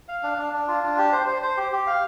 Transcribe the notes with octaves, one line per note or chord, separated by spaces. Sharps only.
F5
D4
D4
D4
F4
D4
G4
C5
C5
C5
G4
G4
F5